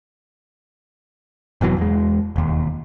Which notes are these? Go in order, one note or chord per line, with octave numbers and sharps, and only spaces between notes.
F1 B2 E3 F#3
E2 G#3
E1 D#2